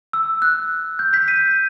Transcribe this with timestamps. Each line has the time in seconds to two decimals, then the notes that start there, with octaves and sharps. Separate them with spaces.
0.13 E6
0.42 F#6
0.99 G6
1.13 G6 B6
1.28 B6 D#7